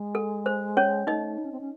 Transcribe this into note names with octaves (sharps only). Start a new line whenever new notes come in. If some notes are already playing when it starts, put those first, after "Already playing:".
Already playing: G#3
A4
C5
C#4 C#5
A3 D#4 D#5
D#4
C#4
C4
C#4